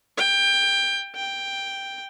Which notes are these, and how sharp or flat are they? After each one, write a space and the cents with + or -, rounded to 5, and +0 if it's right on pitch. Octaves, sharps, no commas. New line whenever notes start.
G5 +20
G5 +5